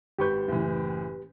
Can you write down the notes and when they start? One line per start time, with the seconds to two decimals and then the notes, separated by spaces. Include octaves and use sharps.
0.19 G#1 G4 B4 C#6 G6
0.48 F#1 A2 E3